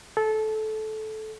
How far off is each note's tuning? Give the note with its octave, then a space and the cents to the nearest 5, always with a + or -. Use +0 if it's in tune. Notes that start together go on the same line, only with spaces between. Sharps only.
A4 -20